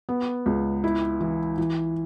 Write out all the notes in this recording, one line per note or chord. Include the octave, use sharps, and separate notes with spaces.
B3
C#2
E4
E3
E3